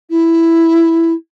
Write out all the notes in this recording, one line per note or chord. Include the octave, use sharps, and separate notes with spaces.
E4